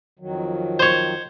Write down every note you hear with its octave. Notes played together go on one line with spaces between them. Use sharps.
F2 D#3 F#3
C5 C#5